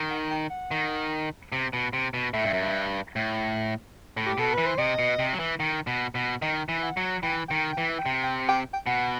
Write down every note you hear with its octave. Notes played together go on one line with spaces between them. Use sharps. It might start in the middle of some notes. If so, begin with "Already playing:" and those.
Already playing: D#3
F#5
G5
F#5
D#3
C3
B2
C3
B2
A2 E5
G2
F#2
G2
A2
A2
G4
B2 A4
E3 B4
C5
C3 D#5
B2
C3
F#3
E3
D#3
B2
B2
D#3 D#5
E3
F#5
F#3
E3 G5
D#3 G5
E3 G5
G5
C3
G5
G5
G5
B2 F#5